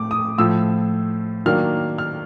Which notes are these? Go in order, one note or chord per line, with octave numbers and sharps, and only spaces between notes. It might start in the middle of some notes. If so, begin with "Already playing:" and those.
Already playing: A2 A3 D6
D#6
A2 F3 A3 E6
D#3 F#3 A#3 D4 F6
F6